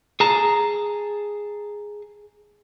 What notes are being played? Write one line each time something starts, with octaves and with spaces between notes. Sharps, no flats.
G#4 A5 A#5